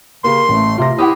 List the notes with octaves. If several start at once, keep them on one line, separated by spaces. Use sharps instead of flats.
C#3 A#3 G4 C6
A1 A3
C3 F4 A#6
E4 G4 F#5 D6 D#6